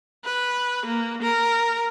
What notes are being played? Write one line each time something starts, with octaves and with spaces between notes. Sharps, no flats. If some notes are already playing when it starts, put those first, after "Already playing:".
B4
A#3
A#4